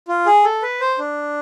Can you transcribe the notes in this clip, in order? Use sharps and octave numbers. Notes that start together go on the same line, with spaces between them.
F4
G#4
A4
B4
C5
D4